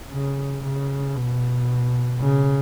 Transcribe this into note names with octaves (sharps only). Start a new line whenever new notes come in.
C#3
C#3
B2
C#3